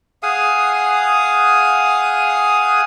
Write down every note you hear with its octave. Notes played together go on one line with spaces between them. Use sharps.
G#4 F5 F#5 D#6